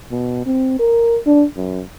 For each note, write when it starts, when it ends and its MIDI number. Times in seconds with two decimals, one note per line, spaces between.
0.11 0.43 47
0.46 0.79 60
0.79 1.18 70
1.27 1.45 62
1.56 1.82 42